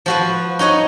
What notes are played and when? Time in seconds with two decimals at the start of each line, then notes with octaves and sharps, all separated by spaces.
0.06 F3 F#4 B4
0.59 D#4 F#4 C#5 D#5